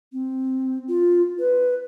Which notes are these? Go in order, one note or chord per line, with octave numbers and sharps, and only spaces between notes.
C4
F4
B4